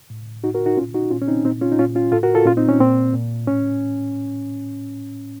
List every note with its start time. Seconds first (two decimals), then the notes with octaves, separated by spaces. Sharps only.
0.10 A2
0.43 A2 D#4 F#4
0.55 F#4 A#4
0.66 D#4 F#4
0.77 A#2 C#4 F4
0.94 D#4 F#4
1.11 A#2 C#4 F4
1.22 C#4
1.28 C4 D#4
1.45 A#2 C4 D#4
1.61 C#4 F4
1.72 D#4
1.79 A#2 C#4 F4
1.95 C#4 F4
2.12 A2 F4 A4
2.23 F#4 A#4
2.35 F4 A4
2.45 A#2 C#4 F4
2.57 C4 D#4
2.68 C#4
2.79 A#2 C4
3.13 A#2
3.47 A2 C#4